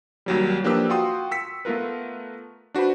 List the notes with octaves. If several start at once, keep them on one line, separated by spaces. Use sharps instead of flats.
D#2 F#3 G3
F3 A#3 D4 G4 B4 E6
F4 F#4 G5 C6 D#6
E6 B6 C#7
A3 B3 F4 A#4 B4
D4 F#4 B4 C5 B5